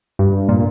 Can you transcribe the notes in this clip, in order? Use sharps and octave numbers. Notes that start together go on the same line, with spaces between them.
G2
A#2